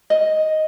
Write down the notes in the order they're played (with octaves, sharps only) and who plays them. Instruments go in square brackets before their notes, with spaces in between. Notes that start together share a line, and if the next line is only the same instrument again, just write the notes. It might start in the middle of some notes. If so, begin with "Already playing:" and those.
[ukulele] D#5